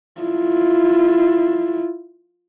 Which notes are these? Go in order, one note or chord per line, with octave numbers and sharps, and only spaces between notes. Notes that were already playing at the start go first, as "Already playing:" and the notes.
E4 F4